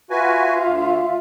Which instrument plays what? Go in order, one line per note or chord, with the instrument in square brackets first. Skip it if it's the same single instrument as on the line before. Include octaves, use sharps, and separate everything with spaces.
[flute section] F4 E5 F5 [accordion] F#4 B4 G#5
[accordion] D2